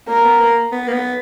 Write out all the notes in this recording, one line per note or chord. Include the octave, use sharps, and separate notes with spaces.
A#3 A#4
B3
A#3
B3
A#3
B3